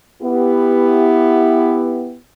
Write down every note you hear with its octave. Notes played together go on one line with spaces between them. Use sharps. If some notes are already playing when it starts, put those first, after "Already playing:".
B3 E4 G4